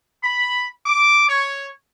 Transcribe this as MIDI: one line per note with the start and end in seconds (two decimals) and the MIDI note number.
0.23 0.67 83
0.86 1.29 86
1.29 1.68 73